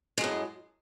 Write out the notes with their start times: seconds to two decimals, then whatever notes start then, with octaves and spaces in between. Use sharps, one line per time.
0.18 G#3
0.21 F#2
0.24 A2